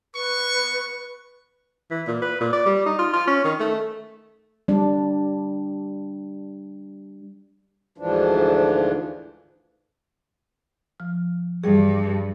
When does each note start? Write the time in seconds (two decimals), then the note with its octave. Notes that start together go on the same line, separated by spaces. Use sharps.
0.15 B4 C#6
1.91 E3
2.07 A#2
2.22 B4
2.41 A#2
2.53 D5
2.66 G3
2.86 D#4
2.99 F4
3.13 F4
3.27 C#4
3.44 D#3
3.60 A3
4.68 G3 D4
7.98 D2 G#2 E3 F3 D4
11.00 F3 F6
11.64 G2 E3 G3 G#4